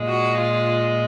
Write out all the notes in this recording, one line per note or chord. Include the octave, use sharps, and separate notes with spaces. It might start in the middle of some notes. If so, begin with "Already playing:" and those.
Already playing: A#2 G#3
F#4
F4